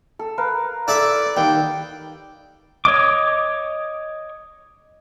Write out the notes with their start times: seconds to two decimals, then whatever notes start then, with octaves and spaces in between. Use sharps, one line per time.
0.19 A4
0.38 A#4 B4 F5
0.88 E4 A4 D5 E5
1.37 D#2 G3 G5
2.85 C#5 D#5 D6